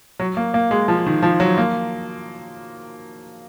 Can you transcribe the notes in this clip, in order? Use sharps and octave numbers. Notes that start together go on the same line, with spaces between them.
F#3
A#3
A#3
G#3
F3
D#3
F3
F#3
A#3